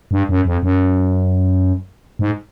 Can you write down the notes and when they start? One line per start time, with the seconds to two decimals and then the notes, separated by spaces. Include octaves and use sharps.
0.11 G2
0.29 F#2
0.45 F2
0.63 F#2
2.19 G#2